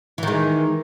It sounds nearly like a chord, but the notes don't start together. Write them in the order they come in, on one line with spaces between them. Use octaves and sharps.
E3 D#3 G#3